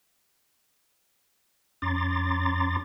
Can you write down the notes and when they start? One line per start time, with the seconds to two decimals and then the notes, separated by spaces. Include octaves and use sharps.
1.82 F2 C#4 A#5 C6 D6 A6